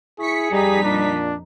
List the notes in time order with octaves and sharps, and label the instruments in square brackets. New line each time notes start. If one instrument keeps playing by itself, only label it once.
[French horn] E4 [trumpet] G#4 [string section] C#6 B6 C#7
[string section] F2 D#4 B6 [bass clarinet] G3 [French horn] G4
[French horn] A#2 [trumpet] D4